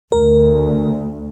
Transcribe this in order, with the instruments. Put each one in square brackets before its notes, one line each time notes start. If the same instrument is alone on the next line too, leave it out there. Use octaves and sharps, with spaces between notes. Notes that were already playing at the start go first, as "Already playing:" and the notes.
[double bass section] D2 [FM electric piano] A#4